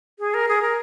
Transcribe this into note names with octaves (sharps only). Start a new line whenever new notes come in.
G#4
A#4
G#4
A#4